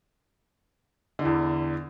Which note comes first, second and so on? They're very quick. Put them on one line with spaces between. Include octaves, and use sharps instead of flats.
D3 E3 E2